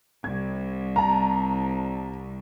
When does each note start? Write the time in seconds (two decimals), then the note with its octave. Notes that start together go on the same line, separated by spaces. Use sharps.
0.24 C2 G#6
0.96 A5 A#5